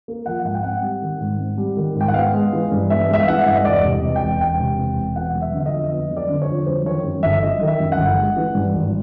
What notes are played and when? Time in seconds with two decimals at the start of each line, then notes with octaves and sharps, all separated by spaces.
0.08 A#3
0.26 F3 F#5
0.45 G#2 F#5
0.55 G5
0.63 C4 F#5
0.82 G3
1.02 D#3
1.20 G#2
1.40 C4
1.58 G3
1.77 D#3
1.95 G#2
2.01 G5
2.08 F#5
2.14 B3 F5
2.34 G#3
2.53 E3
2.72 G2
2.90 B3 E5
3.09 G#3 E5
3.20 F5
3.28 E3 F#5
3.46 G2 E5
3.56 D#5
3.65 E1 D5
3.84 C3
3.91 D#5
4.03 E2
4.16 G5
4.21 E1
4.40 E1 G5
4.60 C3
4.79 E2
4.97 E1
5.16 B3 F#5
5.35 F#3
5.42 E5
5.54 D3
5.60 E5
5.66 D#5
5.72 F2
5.91 B3 D#5
6.10 F#3
6.17 D5
6.29 D3
6.42 C#5
6.49 F2
6.66 F#3 C5
6.86 D#3 C#5
7.04 F#2
7.23 G1 E5
7.43 F#3 D#5
7.61 D#3
7.67 E5
7.80 F#2
7.92 F#5
7.98 G1
8.18 G#3
8.37 E3
8.55 G2
8.74 G#1